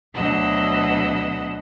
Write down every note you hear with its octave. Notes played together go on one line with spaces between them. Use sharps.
D2 B2 F#3 D#5 F#5 E6